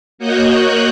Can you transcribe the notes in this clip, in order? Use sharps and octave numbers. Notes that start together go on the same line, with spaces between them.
A#3 F#4 C#5 D#5 F#6 G6